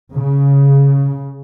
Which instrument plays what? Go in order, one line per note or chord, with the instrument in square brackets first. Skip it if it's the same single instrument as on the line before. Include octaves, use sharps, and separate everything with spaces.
[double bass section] C#3